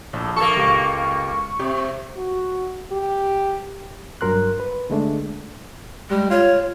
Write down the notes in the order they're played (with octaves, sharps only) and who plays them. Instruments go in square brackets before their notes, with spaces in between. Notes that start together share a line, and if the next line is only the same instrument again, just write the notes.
[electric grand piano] A#1 [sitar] A2
[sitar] A#3 A4 [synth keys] C#6
[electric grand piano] C#2 G4 D6
[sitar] C3 [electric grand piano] G4
[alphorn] F#4
G4
[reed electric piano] G2 F#3 A#4 C6 F#6
B4
D3 G#3 A3 D4
[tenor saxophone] G3 [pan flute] G#3
[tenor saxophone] F4 [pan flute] C#5